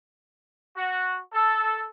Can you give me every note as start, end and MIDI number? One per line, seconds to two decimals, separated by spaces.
0.77 1.19 66
1.33 1.88 69